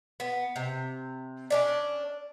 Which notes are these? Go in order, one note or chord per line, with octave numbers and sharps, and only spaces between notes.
B3
C3
C#4 D4 D5